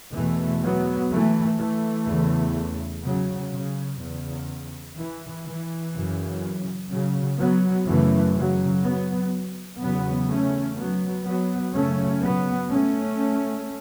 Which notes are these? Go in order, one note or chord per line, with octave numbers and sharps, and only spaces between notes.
E2 B2 E3 A3
F#3 B3
E3 A3
E3 A3
E2 C#3
C#3 F#3
C#3
E2 C#3
E3
E3
F#2 C#3
C#3 F#3
F#3 B3
F#2 C#3 E3 A3
C#3 F#3
F#3 B3
E2 C#3 F#3 B3
A3 C#4
F#3 B3
F#3 B3
F#2 C#3 A3 C#4
F#3 B3
A3 C#4